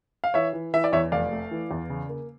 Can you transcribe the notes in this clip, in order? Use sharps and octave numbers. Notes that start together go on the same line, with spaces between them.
F5
E3 C#5 E5
E3
E3 E5
D5
E2 C#5 E5
F1 D5 F5
A3
E3
E2
C#3
A#3